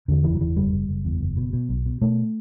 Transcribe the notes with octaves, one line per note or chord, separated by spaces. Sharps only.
E2 D3
F#1 E3
F#3
E2 E3
F#1 G3
F#1
F#1
E2
F#1
B2
B2
B1
B2
B2 A3